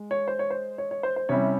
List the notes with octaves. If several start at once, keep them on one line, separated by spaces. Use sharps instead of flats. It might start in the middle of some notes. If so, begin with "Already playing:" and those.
Already playing: G#3
C#5
C5
C#5
C5
C#5
C#5
C5
C5
C3 G3 C#4 E4 C#5